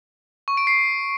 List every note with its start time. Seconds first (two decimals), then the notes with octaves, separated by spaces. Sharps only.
0.48 C#6
0.57 D7
0.67 C7